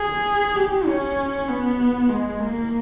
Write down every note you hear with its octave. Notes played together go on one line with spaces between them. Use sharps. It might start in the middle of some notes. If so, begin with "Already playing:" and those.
Already playing: G#4
G4
C#4
B3
G#3
A#3